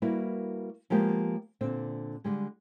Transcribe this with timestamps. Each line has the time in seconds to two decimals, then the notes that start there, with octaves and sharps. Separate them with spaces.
0.02 G3 A#3 E4 F#4 A#4 B4
0.90 F3 G#3 A#3 B3 F4 G4
1.61 A#2 D3 C4 D4
2.24 D3 G3 G#3